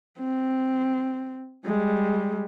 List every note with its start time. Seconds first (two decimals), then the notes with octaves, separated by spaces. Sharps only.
0.19 C4
1.66 G3 G#3